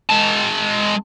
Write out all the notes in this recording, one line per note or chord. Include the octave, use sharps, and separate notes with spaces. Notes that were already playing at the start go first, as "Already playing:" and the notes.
G#3 A5